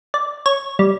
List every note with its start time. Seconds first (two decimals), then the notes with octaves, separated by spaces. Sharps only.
0.14 D5
0.46 C#5
0.79 G3